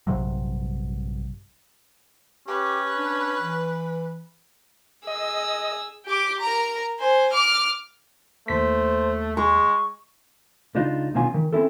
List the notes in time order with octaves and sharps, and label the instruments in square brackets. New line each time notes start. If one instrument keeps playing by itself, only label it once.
[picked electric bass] A#1 G2 C3 F#3
[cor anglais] C#4 [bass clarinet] G4 [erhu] B4
[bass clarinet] D4
E3
[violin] G#4 E6 [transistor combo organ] D#5
[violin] G4 D6
A#4 A#5
C5 G#5
D6 F6
[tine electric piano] D#2 B6 [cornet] A3 [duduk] C5
[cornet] G#3 [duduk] G#4 [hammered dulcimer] C#6
[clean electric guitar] C#2 D4 D#4 F4
C2 B2 D#3 C#4 F4 G#5
D#3
C4 C#4 E4 A4